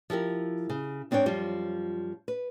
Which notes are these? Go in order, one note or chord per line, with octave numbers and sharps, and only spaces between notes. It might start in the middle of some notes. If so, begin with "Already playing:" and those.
F3 E4 G4 A#4
C#3
G#2 C4 D4 C#5 G5
F#2 F3 G3 F4
B4